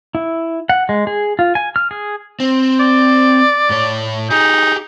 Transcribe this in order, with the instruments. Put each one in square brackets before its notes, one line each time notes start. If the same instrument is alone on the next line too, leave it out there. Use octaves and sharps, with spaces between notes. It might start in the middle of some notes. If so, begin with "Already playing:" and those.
[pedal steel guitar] E4
F#5
G#3
G#4
F4
G#5
F6
G#4
[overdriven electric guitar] C4
[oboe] D5
[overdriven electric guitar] A2 C#5
[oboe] D#4 [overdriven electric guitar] G4 G#4